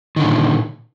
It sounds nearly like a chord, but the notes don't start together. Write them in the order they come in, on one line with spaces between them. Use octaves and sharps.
D#3 D3 A#2